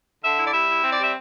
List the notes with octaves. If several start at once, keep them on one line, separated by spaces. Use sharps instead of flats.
D3 E5
E4
D5
G3 E5
E4
C4
D5
G3 E5